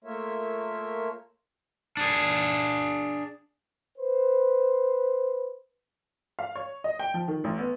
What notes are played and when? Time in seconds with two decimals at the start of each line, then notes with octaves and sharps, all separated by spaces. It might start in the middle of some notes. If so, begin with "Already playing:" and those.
0.04 A3 A#3 F4 A#4 C#5 E5
1.97 D4 G#4
3.98 B4 C5
6.39 F5
6.55 C#5
6.84 D#5
6.99 G5
7.14 F3
7.28 D#3
7.44 A1
7.58 B3